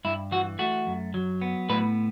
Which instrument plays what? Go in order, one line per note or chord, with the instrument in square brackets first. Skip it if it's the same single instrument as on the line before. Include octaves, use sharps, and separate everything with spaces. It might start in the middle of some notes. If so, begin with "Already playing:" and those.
[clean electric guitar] G2 E4
E3 F#4
A3 F#4
F#2
F#3
B3
A2 B4